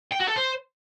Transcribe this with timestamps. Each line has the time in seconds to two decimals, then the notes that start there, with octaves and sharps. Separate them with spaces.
0.12 G5
0.20 F#4
0.28 A4
0.36 C5